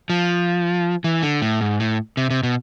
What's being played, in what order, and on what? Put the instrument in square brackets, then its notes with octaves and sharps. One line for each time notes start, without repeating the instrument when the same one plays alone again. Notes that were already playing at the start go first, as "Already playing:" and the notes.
[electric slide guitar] F3
E3
D3
A2
G#2
A2
C3
C3
B2